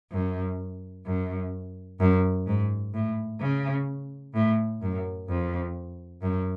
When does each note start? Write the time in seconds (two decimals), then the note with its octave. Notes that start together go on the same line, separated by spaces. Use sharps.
0.12 F#2
1.06 F#2
2.00 F#2
2.46 G#2
2.94 A2
3.40 C#3
4.34 A2
4.82 F#2
5.29 F2
6.22 F#2